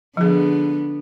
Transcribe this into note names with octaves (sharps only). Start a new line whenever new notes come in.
D3 F3 B3 G#4